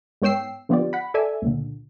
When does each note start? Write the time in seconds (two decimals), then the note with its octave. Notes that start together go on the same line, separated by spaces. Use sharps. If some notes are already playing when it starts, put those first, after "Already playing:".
0.22 G#2 B3 C#5 G5 E6 C7
0.69 D3 F3 B3 F4 G4 D5
0.93 F#5 B5
1.14 A4 D5 E5 G#5
1.42 C#2 A#2 D3